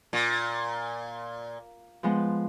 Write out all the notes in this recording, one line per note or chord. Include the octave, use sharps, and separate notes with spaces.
A#2
F3 G#3 B3